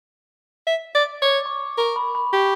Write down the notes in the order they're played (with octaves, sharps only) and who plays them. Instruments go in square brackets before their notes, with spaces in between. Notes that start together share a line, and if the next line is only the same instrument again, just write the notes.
[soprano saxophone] E5
D5
[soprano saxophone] C#5 [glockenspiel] D6
[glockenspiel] C#6
D6
[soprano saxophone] A#4 [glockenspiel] C#6
[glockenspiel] B5
B5
[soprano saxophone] G4 [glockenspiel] C#6